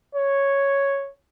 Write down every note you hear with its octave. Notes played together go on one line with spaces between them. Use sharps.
C#5